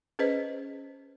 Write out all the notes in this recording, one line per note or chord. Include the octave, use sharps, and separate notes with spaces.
C#4 G#4 B4 C5 D#5